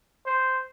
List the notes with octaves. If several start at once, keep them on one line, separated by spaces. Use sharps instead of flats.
C5